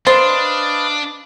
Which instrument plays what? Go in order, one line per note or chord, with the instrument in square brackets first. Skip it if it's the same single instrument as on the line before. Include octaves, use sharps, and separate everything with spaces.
[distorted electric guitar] D4 [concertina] B4 D#5 F5 [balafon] C5 [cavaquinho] C6